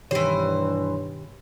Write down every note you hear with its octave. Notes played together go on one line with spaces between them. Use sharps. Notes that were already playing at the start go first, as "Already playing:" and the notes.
G2 B2 D#3 E3 G4 C5 C#5